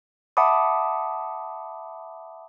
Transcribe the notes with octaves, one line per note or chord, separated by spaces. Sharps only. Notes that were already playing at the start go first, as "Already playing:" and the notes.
E5 F#5 A5 B5 D6 D#6